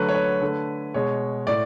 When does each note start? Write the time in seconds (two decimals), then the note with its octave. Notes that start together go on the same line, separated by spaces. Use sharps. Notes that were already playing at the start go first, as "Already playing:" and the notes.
Already playing: D3 F#3 A3 B4
0.09 C#5
0.15 B4
0.42 D3 A3
0.94 B2 G#3 C#5
1.47 A2 D5